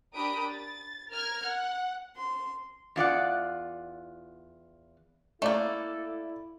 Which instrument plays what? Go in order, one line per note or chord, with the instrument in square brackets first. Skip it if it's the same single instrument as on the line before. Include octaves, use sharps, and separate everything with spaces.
[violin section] D4 G4 A#4 B5 D#6 D7
A6
A#4 F6 G#6
F#5
[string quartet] C6
[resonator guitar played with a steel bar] E2 F4 D5 F#5
[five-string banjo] A3 A#3 [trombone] E4 [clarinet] A4 [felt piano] D5